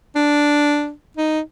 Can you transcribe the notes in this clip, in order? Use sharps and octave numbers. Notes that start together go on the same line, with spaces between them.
D4
D#4